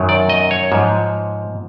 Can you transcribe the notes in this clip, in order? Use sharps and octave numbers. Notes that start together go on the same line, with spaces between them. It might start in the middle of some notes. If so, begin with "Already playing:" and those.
Already playing: F#2 D#3 F#3
D5
D#5
C#5
G#2 F3